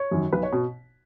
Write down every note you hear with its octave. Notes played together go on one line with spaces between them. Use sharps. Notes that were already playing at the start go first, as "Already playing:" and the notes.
Already playing: C#5
F#2 D#3 F#3
B1 B4
C#5
B2